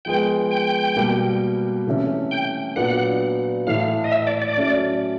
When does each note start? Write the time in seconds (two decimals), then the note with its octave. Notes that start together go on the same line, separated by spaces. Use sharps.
0.05 F3 G#3 B3 G5
0.51 G5
0.96 B2 G3 A#3
1.86 C3 E3 A3 C#4
2.31 G5
2.76 A#2 F#3 B3 D4 F#5
3.67 A2 E3 A3 F5
4.04 D#5
4.12 E5
4.27 D5
4.42 D5
4.58 F#3 A3 C#4